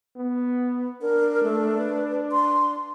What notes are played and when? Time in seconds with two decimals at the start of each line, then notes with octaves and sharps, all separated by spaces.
0.17 B3
1.02 D4 A#4
1.43 A3
1.78 B4
2.32 C6